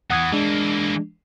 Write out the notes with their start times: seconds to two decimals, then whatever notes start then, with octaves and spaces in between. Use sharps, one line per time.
0.10 E2 E3 F#5 D#6 G#6
0.32 E3 G#3 A#3 D4